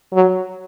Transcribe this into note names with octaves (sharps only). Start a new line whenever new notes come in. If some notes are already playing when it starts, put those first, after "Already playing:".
F#3